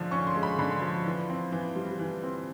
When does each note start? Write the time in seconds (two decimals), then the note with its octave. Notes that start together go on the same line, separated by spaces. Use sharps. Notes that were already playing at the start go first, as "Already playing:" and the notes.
Already playing: D3 F3 G#3 C#4
0.11 C#4 C#6
0.27 C6
0.35 G#3
0.43 B5
0.58 D3 B5
0.82 F3
1.06 E3
1.30 C4
1.52 E3
1.75 G3
1.99 E3
2.23 C4